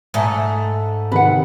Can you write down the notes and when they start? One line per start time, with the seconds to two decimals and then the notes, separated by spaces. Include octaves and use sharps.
0.14 G#2 A3
1.12 C3 D#3 C4 B4 F#5